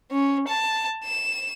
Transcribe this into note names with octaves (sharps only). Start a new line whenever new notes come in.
C#4
A5
E7